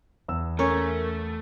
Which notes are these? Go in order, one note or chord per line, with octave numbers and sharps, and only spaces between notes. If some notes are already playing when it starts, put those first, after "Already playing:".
E2 E6
A3 C#4 A#4 C#6